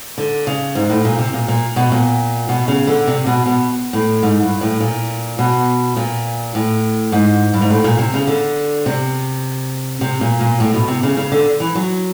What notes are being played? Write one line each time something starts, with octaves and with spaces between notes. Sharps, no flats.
D3
C#3
G#2
A2
A#2
C3
A#2
A#2
B2
A#2
B2
C#3
D3
C3
B2
B2
A2
G#2
G2
A2
A#2
B2
A#2
A2
G#2
G2
G#2
A2
A#2
C3
C#3
D3
C3
C3
A#2
A#2
A2
B2
C3
C#3
C#3
D3
E3
F#3